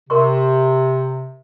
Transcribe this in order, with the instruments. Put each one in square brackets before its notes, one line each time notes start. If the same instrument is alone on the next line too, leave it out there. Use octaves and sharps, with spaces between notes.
[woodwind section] C3 [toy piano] A#4 C6 C#6